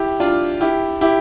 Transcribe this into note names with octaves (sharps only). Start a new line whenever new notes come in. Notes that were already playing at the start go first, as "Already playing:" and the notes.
Already playing: E4 G4
D4 F4
E4 G4
E4 G4